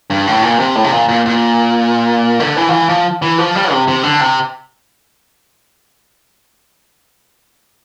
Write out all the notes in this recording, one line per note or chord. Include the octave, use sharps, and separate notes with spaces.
G2
A2
A#2
C3
A2
C3
A#2
A#2
A#2
D3
E3
F3
E3
F3
E3
F3
G3
C3
C3
D3
C3